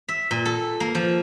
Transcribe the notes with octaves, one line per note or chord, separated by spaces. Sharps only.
E5
A#2
A4
A#3
F3